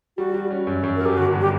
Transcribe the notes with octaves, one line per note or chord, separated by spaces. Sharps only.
G3 F#4
G3
C#4
F#2
F#2
F#3 A#4
G4
G1 F#4
G2
G4